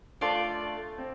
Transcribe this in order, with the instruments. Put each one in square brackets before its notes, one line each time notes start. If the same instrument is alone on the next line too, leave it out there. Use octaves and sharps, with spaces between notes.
[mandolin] A3 F4 D5 A5 [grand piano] D4
[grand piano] C4